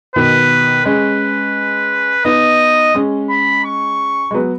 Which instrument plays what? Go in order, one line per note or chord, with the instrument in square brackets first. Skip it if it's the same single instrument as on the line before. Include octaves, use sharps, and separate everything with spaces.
[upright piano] B2 D#3 [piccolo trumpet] B4
[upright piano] G#3 C#4 [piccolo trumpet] B4
[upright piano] B3 D#4 [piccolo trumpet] D#5
[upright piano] G#3 C#4
[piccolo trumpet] B5
C#6
[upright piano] G#3
F#3 B3